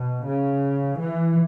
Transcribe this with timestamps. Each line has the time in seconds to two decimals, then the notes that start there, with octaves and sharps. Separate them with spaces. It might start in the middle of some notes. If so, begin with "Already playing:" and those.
Already playing: B2
0.27 C#3
0.99 E3